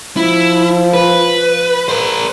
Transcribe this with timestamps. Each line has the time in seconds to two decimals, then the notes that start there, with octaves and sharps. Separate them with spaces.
0.17 F3 E4
0.94 B4
1.88 A#4 C5